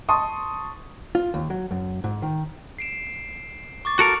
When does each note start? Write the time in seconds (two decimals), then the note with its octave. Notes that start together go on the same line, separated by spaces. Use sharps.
0.09 A5 C6 C#6 D#6
1.15 F4
1.34 D#2
1.50 F#3
1.71 F#2
2.04 G#2
2.22 D#3
2.79 C7 D7 E7
3.85 C#6 D6 A6
3.99 F#4 A4 A#4